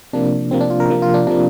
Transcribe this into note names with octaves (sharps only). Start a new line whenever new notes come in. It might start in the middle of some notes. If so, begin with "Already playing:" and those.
C3 F3 A#3 D4
C3 F3 A#3 C4
D4
F4
A#4
C3 F3 A#3
F4
D4
C3 F3 A#3 D4